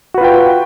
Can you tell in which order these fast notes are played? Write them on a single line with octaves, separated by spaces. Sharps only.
F#4 B4 F4 G5